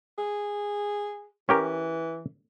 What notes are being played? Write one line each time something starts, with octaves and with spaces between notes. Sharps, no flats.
G#4
E3 C#4 G4 A#4